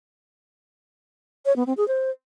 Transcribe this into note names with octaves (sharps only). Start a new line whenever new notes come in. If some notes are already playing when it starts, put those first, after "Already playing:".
C#5
B3
C4
G#4
C5